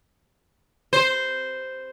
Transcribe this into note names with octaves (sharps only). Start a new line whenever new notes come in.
C5